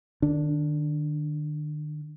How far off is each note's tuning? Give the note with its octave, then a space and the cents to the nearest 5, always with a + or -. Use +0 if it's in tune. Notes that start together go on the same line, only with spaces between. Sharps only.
D#3 -45 D4 +0